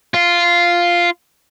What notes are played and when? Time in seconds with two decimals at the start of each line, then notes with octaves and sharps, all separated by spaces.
0.14 F4